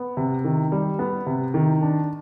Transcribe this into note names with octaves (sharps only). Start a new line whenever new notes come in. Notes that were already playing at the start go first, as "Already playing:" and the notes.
Already playing: B3
C3
D#3
G3
B3
C3
D#3
D4